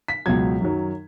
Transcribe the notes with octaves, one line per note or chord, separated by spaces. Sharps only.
B6
C#2 B2 F#3 G#6
F#2 D#3 F#3